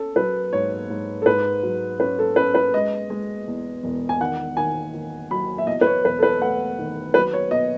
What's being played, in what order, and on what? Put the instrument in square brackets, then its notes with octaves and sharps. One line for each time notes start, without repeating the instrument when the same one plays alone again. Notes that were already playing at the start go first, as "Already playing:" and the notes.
Already playing: [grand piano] C#4 A4
F#3 B4
G#2 C#5
G#2
A4
G#2 B4
F#3
C#4 B4
A4
C#4 B4
B4
G#3 D#5
G#3
E2
E1
G#5
D#3 F#5
D#3 G#5
D#3
F#3 B5
E5
E2 D#5
B4
C#5
E1 B4
A4
B4
A3 F#5
D#3
F#3 B4
C#5
B2 D#5